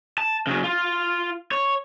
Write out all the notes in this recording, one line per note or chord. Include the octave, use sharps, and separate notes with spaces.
A5
C#3 F#3
F4
C#5